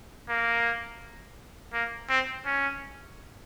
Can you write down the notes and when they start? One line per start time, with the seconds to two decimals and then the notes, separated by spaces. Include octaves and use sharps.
0.29 A#3
1.73 A#3
2.09 C4
2.46 C#4